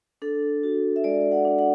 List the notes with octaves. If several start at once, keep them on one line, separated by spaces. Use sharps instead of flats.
D4 A4
F#4
E5
G#3 D5
F#5
D4
F#5